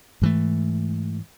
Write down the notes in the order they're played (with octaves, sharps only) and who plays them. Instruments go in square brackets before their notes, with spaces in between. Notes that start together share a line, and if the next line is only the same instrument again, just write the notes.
[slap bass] G#2 E3 A3